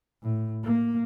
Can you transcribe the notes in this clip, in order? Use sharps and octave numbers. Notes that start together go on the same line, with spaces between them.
A2
A#3